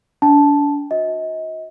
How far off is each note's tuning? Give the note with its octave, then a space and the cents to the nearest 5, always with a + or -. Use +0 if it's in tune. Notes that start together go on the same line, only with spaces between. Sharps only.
D4 -35 A5 -10
F#4 -35 D#5 +35